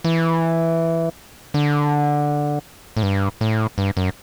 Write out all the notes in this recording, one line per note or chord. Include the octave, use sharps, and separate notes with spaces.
E3
D3
A2
G2
A2
G2
F#2